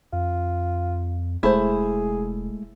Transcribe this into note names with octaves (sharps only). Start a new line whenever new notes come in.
F2 F4
E1 G#3 A3 E4 G#4 C5